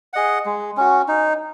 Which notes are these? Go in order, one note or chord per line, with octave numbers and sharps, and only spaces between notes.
G#4 D#5 F#5
G#3
C#4 F#4
D#4